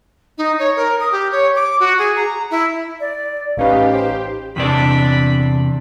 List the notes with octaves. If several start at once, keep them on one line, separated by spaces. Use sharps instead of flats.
D#4
C#5
A#4
D#6
G4
C#5
D6
F#4
G#4
A#5
E4
D5
A1 C#4 D#4 G4 B4 F5
C5
E2 C3 D4 D5 B5